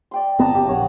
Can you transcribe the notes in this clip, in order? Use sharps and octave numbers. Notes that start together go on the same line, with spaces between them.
D5 G5 C6
G1 B3 C4 D#5 A5 A#5
F#1 G4
A#1 C#5 F#5